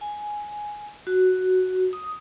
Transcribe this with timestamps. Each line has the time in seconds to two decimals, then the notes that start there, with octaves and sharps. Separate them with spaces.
0.01 G#5
1.07 F#4
1.93 D#6